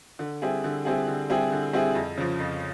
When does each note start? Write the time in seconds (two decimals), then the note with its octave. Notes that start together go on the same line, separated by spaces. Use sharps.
0.19 D3
0.42 G3 C4 E4 G#4
0.64 D3
0.85 G3 C4 E4 G#4
1.08 D3
1.30 G3 C4 E4 G#4
1.52 D3
1.73 G3 C4 E4 G#4
1.95 F2
2.18 C#3 F3
2.40 F2